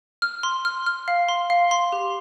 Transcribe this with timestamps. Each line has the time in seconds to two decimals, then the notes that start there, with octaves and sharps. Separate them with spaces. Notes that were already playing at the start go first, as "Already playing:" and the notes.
0.22 F6
0.43 C6
0.65 F6
0.86 F6
1.08 F5
1.29 C6
1.50 F5
1.71 C6
1.92 G4